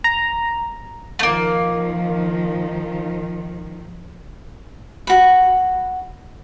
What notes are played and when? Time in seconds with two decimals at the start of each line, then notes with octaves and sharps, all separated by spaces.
0.04 A#5
1.19 D#3 F3 A3 A#3
5.07 F#4 B5